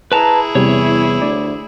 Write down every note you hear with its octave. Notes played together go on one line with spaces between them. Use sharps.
E4 G#4 B4 A5 A#5
E2 C3 G3 C#5
D2 D5